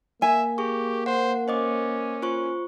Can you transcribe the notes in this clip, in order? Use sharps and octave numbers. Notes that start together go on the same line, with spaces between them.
A#3 E5 G#5
G4 G#4 C#6
C5 F#5
C#4 C5 D#5 D6
F4 C5 C#6